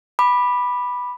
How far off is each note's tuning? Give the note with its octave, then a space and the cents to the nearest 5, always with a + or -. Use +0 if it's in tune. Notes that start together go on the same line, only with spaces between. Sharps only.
B5 -5 D6 +20